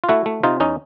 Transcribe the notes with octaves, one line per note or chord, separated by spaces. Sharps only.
F4
A3 E4 F#4
A3
C3 D#4 F4
E2 C#4 D#4